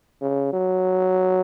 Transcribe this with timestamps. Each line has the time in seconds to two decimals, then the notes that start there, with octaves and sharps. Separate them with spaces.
0.22 C#3
0.53 F#3